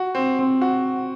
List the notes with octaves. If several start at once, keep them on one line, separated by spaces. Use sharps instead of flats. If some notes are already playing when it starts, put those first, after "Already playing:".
Already playing: F#4
C4
C4
F#4